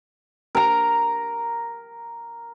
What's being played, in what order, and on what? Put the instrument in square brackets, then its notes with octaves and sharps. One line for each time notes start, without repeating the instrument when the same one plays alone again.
[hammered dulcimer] A#4 A#5